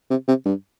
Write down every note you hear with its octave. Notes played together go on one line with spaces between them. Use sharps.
C3
C3
G2